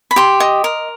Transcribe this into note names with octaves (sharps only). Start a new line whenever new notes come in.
B5
G4 C6
D#5
A#4